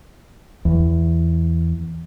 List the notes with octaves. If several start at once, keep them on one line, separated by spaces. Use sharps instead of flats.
E2